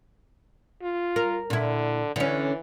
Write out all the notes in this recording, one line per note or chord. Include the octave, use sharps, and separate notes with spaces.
F4
A#4
A#2 D3 E4
D3 E3 C#4